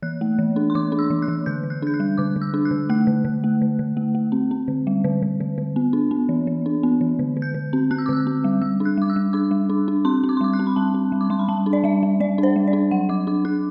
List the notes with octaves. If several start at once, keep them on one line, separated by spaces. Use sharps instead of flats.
E3 F#6
A3
E3
D4
C6
E3 D6
D4
E6
E3
F#6
E3
D3 G6
D3
F#6
D4 G6
F#6
G3
D3 D6
D3
E6
D4
F#6
D3
A3 F#6
D3
D3
A3
D3
D3
A3
A3
C4
C4
D3
G3
D3
D3
D3
D3
B3
D4
B3
E3
E3
D4
B3
E3
D3
D3
G6
D3
C4
C4 F#6
E6
D6
D3 E6
C4
G3
G3 E6
D4
F#6
G3 D6
E6
G3
D4 D6
G3
D4
D4
C4 C6
C4
D6
C6
G3 D6
F#6
C4
B5
G3 A5
C4
G3
D6
G3 C6
B5
G3 A5
D4
D5
G3 E5
G3
G3 D5
D4
C5
G3
D5
D4
F#3 F#5
F#3 D6
D4 D6
D4 F#6